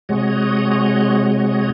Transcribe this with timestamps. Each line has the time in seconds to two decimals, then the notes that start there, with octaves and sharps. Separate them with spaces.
0.09 C3 G#3 F#4 C#5 D#6